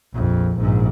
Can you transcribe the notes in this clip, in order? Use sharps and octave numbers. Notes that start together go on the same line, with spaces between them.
A#1 F2
A#1 G#2